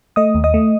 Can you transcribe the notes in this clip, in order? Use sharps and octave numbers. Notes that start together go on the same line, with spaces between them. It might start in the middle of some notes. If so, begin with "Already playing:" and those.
A3 D#5 D#6
D#2
D#5 D#6
A3